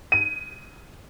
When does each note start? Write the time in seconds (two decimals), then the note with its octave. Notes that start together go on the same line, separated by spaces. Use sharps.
0.12 D#7